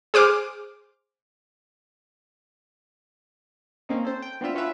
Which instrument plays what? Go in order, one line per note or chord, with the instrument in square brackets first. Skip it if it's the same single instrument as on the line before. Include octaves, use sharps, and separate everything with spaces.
[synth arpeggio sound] G#4 C5 D6 F6
[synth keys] A#3 C4 C#4 D#4
A4 C5
G5
B3 C4 D4 F4 E5
C#4 F4 F#4 B4 E5